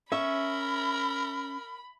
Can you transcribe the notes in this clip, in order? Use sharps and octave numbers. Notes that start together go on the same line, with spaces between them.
C#4 A#4 E5 B5 C#6